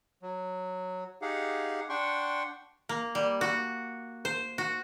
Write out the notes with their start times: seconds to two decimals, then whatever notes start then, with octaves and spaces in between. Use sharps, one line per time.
0.22 F#3
1.22 D#4 G4 G#4 F5 F#5
1.89 D4 F#5 G5 C6 C#6
2.89 A#3
3.15 G3
3.41 F#4
4.25 C5
4.58 F#4